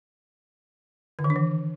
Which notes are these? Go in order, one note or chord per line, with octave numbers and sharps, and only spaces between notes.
D3
D#3
D4
E3